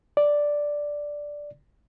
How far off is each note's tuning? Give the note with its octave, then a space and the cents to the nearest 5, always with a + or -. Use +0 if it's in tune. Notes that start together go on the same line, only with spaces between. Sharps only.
D5 +0